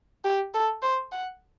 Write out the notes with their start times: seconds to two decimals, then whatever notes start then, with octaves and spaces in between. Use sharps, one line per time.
0.24 G4
0.54 A4
0.82 C5
1.12 F#5